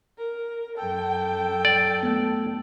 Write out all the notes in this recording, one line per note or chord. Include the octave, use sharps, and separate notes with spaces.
A#4
F#2 A4 G5
D5
A3 B3